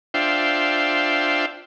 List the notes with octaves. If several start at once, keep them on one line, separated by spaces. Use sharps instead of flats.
D4 F4 C5 E5 G5